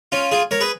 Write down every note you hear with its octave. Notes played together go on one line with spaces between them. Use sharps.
C#4 F4
F4 G#4
A#4 C#5
G#4 B4